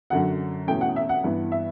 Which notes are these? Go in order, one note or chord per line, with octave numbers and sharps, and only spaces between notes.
F#2 D3 F#3 C#4 F#5
E2 B2 A3 C#4 G5
F#5
E5
F#5
G2 E3 B3
E5